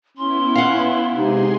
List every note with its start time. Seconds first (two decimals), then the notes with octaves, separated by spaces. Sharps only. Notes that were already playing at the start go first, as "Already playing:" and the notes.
0.18 B3 C#4 E4 C6
0.55 F5 F#5
1.14 C3 G#3 D#4 G#4 C6